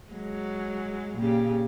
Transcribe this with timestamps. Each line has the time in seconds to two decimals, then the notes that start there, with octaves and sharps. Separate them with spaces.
0.10 F#3 G#3
1.16 A#2 C#3 G4